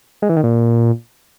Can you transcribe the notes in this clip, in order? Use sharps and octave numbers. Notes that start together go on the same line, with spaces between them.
G#3
E3
D#3
A#2